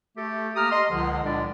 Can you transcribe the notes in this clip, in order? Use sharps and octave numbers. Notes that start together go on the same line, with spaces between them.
A3 G4 A4
A#3 G4 A#5 D#6 F6
D#5 C6
C#2 D3 F3
C#2 A#2 G#3 D4 E4 D5